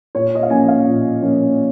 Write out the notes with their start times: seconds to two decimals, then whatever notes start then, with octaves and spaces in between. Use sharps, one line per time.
0.15 A#2 C#5
0.35 D#5
0.43 F5
0.50 F3 A#3 C#4 G#5
0.68 F5
0.87 A#2
1.22 F3 A#3 C#4